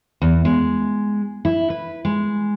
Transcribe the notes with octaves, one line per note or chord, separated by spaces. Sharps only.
E2
G#3
E4
B4
G#3